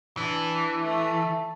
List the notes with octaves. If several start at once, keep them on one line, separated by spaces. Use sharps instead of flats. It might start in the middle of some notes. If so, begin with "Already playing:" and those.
E3 D4
A3